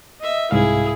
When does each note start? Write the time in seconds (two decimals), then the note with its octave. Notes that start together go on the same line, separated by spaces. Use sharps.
0.20 D#5 E5
0.51 C2 G#2 E4 G#4 F5